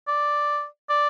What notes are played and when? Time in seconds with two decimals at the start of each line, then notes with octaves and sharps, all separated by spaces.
0.08 D5
0.90 D5